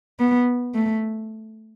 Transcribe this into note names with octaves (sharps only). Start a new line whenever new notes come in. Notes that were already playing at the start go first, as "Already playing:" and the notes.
B3
A3